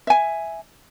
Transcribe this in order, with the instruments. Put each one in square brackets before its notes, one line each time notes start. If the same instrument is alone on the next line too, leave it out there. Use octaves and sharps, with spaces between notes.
[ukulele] E5 G#5